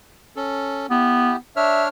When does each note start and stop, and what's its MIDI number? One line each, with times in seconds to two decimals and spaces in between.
0.36 0.87 61
0.36 0.87 69
0.90 1.35 59
0.90 1.36 64
0.90 1.36 67
1.56 1.88 62
1.56 1.88 73
1.56 1.84 76
1.56 1.88 89